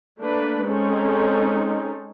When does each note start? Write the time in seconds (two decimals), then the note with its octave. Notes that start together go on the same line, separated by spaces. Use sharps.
0.19 A3 A#3 D4 B4
0.65 G#3 C4 C#4 D#4 A4